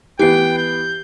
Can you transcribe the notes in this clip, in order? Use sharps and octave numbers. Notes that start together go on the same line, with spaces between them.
E3 B3 G4 G5 C7
G6